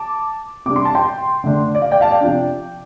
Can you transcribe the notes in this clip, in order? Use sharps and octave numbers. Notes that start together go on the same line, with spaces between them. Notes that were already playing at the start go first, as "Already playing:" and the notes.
Already playing: A5 D6
C3 G3 D4 D6
C6
A5
G5 C6
D3 A3 D4
D5
F5
D5 G5
F5 A5
D5 G5
C3 F3 D4